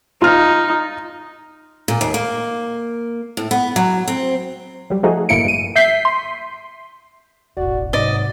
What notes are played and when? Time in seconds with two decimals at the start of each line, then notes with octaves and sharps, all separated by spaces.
0.22 D#4 F4 F6
1.88 A#2
2.01 D#2
2.14 A#3
3.37 A2
3.51 B3
3.76 F#3
4.08 C4
4.90 F#3 G3
5.03 F3 A3 D#4 F#4 G#4
5.29 G1 A2 A#3 E4 C#7 D7
5.45 G2 D#7
5.76 E5 G6 B6 C7
6.05 C6
7.57 E1 A1 F#4 D5
7.93 G#2 C3 F#3 D5 D#5